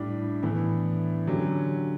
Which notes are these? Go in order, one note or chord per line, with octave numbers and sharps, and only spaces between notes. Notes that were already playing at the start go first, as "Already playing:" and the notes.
Already playing: A2 G3 D4
A2 E3 B3 D4
D3 F#3 C#4 G4